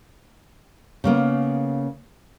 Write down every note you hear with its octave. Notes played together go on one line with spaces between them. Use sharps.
C#3 A#3 B3